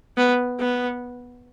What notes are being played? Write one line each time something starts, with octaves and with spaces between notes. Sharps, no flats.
B3
B3